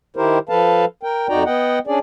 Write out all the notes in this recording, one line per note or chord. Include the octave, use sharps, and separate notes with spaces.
D#3 E4 G4 A#4 C5
F3 A4 B4 F5 A5
A#4 G5
F2 D#4 F#4 D5 G5 A#5
B3 D#5 F#5 G5
C#4 D4 G#4 D5